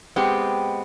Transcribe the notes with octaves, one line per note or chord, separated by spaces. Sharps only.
G#3 B3 C4 G4